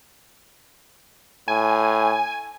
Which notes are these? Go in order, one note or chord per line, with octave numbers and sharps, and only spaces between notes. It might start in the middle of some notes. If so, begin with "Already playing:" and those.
A2 G#5